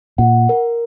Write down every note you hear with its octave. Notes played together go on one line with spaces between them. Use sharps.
A#2 F#5
A#4